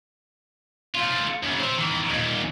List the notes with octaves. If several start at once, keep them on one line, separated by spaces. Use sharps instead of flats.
A3 F4
F#2 C#3
C5 E5
D#3 E3
D#2 A#2